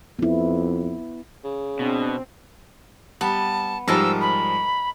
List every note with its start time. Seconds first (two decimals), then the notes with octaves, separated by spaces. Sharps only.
0.19 F2 B3 E4
1.44 C#3
1.79 B2 C4 D4
3.21 G3 B3 A5
3.88 G#2 F3 G3 A#4 D#5 A5 E6
4.21 B5